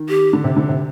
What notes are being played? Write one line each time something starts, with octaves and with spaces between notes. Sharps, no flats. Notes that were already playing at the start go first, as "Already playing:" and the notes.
Already playing: D#3
G4
D3
C3
D3
C3